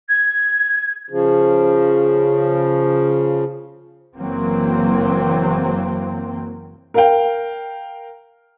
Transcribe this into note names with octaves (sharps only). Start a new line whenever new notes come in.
G#6
C#3 F3
F#1 E3 F#3 A#3 C4
A#4 F5 G5